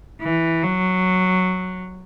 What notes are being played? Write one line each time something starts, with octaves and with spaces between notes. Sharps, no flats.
E3
F#3